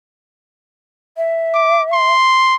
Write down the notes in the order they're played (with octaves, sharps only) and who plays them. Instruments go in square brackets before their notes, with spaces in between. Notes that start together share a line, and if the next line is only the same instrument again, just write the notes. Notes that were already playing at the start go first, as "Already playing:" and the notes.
[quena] E5
[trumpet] D6
C6